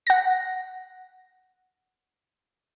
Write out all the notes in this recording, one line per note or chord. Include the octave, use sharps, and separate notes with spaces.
F#5 A#6